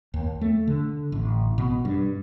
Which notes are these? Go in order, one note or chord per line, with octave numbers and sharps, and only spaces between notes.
D#2
A3
D3
A1
B2
G2